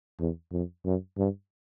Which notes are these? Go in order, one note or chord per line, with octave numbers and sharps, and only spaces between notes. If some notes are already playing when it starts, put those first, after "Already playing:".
E2
F2
F#2
G2